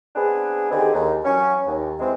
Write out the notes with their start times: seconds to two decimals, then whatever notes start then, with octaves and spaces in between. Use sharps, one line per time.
0.16 B3 C4 D4 G#4
0.71 D3 D#3 C4 D#4 G4 G#4
0.94 D#2
1.24 E3 F#3 C#4
1.66 D#2
2.00 E3 G#3 C4